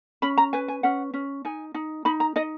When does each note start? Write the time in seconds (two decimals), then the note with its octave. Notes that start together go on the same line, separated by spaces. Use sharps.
0.22 C#4 B5
0.38 A#5
0.53 B4 G#5
0.68 G#5
0.83 C#4 F#5
1.14 C#4
1.45 D#4 G#5
1.74 D#4
2.05 D#4 B5
2.20 A#5
2.36 D#4 D#5